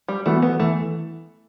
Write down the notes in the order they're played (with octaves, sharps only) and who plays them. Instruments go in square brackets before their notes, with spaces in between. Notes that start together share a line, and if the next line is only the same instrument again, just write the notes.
[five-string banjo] G3
[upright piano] E3 B3 F#4 [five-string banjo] A3
[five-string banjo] B3
[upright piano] E3 [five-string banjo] A3